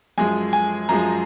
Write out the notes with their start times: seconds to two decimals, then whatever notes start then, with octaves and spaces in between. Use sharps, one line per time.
0.18 F#2 F3 G#3 G#5
0.53 G#5
0.89 F#2 F3 G#3 A#5